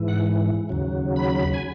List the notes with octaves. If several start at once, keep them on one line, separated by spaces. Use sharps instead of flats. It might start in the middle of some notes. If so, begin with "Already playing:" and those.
Already playing: G#2 E3
F#5
D#2 C#3 F#3
B5
G#5